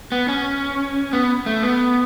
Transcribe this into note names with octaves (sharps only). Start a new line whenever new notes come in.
B3
C#4
B3
A3
B3